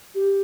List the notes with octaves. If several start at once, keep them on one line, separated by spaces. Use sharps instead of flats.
G4